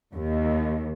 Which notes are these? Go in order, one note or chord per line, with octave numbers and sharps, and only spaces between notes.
D#2